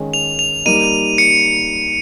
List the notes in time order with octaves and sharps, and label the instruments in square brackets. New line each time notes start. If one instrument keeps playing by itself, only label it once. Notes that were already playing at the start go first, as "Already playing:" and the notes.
Already playing: [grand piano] D#3 G#3 C#4
[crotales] F7
F7
[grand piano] G3 A#3 D#4 [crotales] D#7
[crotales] C#7